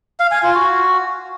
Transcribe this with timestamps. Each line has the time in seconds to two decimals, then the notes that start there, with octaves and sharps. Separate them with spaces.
0.20 F5
0.31 G#5
0.43 F4
0.55 F#4